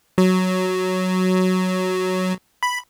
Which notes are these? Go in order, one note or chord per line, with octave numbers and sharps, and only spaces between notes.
F#3
B5